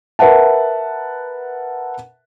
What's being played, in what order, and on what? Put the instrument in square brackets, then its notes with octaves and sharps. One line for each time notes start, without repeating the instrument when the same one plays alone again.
[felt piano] A#4 B4 E5 F#5 A5